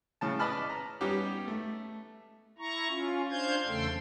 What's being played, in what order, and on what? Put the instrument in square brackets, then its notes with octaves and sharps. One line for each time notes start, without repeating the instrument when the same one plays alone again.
[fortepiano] A2 C#3 A5
B4 D5 D#5 A5 B5 F6
A#5
G3 B3 C#4 D#4 G4
A3
[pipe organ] E4 A#5 C#6
C#4 F4
D4 C5 F5 G6 G#6
E2 C#3 A3 A4 G5 C6